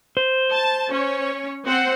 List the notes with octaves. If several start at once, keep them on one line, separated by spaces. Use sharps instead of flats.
C5
A5
C#4 C#5
C4 C5 F#5